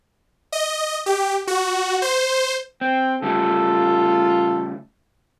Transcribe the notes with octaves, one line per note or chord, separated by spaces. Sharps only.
D#5
G4
F#4
C5
C4 G5
C#3 G3 A3 F4 A4